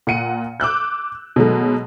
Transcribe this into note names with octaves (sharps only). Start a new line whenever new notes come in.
A#2 F#5 C#7 D#7
D6 E6 F#6 G6
B2 D#3 F#3 G#3 A3